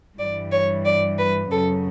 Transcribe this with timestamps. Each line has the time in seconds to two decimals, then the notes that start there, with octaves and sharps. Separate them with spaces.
0.19 G2 E3 G3 D5
0.51 C#5
0.85 D5
1.18 B4
1.51 F#2 C#3 F#3 A4